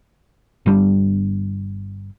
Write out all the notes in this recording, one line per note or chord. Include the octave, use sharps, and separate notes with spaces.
G1 G3 D4